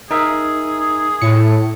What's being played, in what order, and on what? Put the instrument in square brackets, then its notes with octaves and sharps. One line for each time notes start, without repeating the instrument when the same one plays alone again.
[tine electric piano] D#4 A#4 E5 [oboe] G#4
[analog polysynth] A2 [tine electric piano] C#7